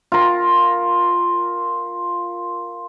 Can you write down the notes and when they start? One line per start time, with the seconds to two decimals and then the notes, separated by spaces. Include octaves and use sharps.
0.12 F4 A#4